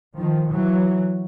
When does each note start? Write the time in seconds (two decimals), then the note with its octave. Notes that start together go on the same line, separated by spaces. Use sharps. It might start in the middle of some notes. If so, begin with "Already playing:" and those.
0.19 D#3 F3
0.51 E3 F#3